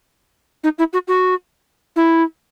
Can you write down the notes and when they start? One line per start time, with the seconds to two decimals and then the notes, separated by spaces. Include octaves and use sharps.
0.64 D#4
0.78 E4
0.93 F#4
1.08 F#4
1.96 E4